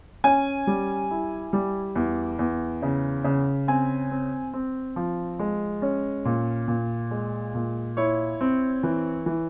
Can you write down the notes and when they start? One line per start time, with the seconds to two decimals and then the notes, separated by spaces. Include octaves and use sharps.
0.24 C#4 G#5
0.67 G3
1.11 E4
1.53 G3
1.95 E2
2.39 E2
2.82 C#3
3.24 C#3
3.68 C4 G#5
4.11 C4
4.53 C4
4.96 F3
5.39 G#3
5.82 C#4
6.25 A#2
6.68 A#2
7.11 G#3
7.55 A#2
7.97 E4 C#5
8.41 C4
8.83 E3
9.26 E3